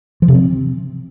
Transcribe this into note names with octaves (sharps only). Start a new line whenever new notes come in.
F3
C3
C4